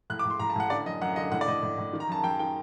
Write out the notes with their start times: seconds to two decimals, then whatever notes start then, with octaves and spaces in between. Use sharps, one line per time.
0.10 A2 F#6
0.19 D6
0.25 A2
0.30 C6
0.39 A2 A#5
0.50 A5
0.56 A2 F#5
0.70 D3 D5
0.86 F#2 D#5
1.01 F#2 F#5
1.16 D3 D#5
1.32 A2 F#5
1.41 D5
1.48 A2 D#5
1.63 A2
1.78 A2
1.93 D#3
2.00 A#5
2.08 F#2 A5
2.23 F#2 G5
2.39 D#3 G5